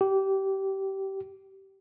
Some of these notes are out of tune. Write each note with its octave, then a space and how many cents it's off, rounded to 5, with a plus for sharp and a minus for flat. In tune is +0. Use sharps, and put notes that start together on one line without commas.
G4 -20